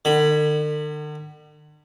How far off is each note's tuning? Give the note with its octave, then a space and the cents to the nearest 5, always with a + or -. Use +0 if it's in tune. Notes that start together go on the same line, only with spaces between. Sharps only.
D3 +45 B5 +0